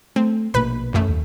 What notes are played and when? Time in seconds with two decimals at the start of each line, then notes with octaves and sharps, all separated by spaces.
0.16 A3 C4
0.54 A#1 B2 A#3 B4 B5
0.93 A1 F#2 A3
1.08 D#2